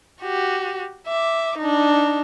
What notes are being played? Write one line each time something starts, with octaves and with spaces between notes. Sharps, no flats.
F#4 G4
E5 D6
D4 D#4